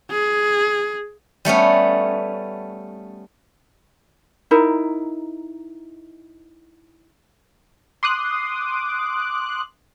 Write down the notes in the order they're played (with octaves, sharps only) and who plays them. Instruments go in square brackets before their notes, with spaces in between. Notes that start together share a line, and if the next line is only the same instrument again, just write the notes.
[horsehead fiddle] G#4
[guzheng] G3 A3 B3 C#4
[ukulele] D#4 E4 A#4
[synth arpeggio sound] C6 D6 D#6 F#6